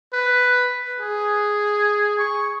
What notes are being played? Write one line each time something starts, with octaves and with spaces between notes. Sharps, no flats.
B4
G#4
C#6